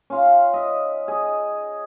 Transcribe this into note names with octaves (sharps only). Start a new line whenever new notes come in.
C#4 F4 F5
D#5 E5
G#4 D#5